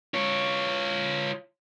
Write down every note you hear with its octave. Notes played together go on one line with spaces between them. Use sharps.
F4 C#5